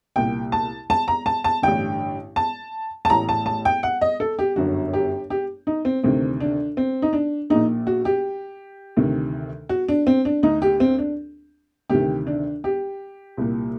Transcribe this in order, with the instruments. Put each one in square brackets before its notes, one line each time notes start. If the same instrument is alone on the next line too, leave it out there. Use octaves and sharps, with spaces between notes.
[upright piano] C2 A#2 G5
A5
A5
A#5
A5
A5
A1 G2 D3 G5
A5
A5
A1 A2 A#5
A5
A5
G5
F#5
D#5
A4
G4
G1 F#2 D3 F#4
G4
G4
D#4
C4
D2 C3 D#3 C4
D4
C4
D#4
D4
A#1 A#2 D#4
F#4
G4
D2 C3 D#3
F#4
D4
C4
D4
D2 D3 D#4
G4
C4
D4
D2 C3 D#3 G4
D4
G4
C2 A#2